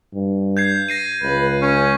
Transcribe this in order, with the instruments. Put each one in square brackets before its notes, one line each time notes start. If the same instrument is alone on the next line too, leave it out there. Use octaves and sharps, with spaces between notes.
[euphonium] G2
[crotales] G6 G#6 C7
A#6 C7 D#7
[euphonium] C#2 [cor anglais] B4
[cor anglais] C#4